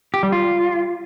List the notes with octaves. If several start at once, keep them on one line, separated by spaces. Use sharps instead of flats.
G4
G3
F4